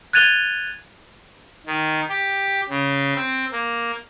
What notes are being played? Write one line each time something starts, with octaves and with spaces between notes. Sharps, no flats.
F#6 G#6 A6 D#7 F7 G7
D#3
G4
C#3
C4
A#3